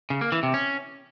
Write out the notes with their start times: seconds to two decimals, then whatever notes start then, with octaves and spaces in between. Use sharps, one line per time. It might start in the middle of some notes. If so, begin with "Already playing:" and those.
0.10 C#3
0.21 A#3
0.32 E3
0.43 C3
0.54 C#4